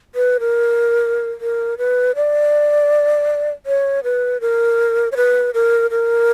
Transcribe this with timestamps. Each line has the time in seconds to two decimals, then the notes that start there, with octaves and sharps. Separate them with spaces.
0.15 B4
0.40 A#4
1.41 A#4
1.78 B4
2.15 D5
3.66 C#5
4.04 B4
4.41 A#4
5.12 C#5
5.17 B4
5.54 A#4
5.91 A#4